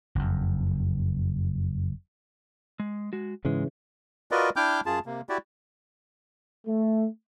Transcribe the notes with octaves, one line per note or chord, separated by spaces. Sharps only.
F#1 F2
G#3
G#3 F#4
G#2 C#3 E3 G#3
F4 F#4 A#4 B4 D5 D#5
D4 E4 G5 D6 F6 G6
F#2 F4 G#4 A5
C3 A#3
E4 F#4 G4 D5
A3